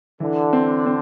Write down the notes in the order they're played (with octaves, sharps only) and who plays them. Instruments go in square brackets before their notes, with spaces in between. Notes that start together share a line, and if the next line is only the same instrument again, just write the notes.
[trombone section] D3 [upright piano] E3
[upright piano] C4
C4